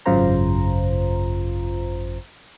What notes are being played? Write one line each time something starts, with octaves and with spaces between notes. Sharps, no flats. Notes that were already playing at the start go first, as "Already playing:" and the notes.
G#1 F#2 C#3 F4 C5 A#5